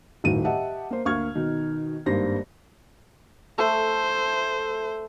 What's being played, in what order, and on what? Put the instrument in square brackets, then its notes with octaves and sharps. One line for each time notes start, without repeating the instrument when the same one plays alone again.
[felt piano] D#1 A2 D#3 F#4 D#7
G4 D#5 E5 F#5 A5
A#3 C5
D2 A#3 F5 C#6 F6 G#6
B2 D#3 D#4
G#1 G2 A#3 C5 A#6
[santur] A3 A4 [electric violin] C5